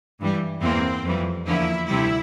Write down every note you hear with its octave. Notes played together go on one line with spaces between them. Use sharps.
G2 E3 G3
E2 E3 A#3 C4
F2 E3 G3
E2 D3 F3 A#3 E4
D2 C3 G3 E4